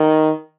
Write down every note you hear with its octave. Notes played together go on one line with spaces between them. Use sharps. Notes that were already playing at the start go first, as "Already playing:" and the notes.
Already playing: D#3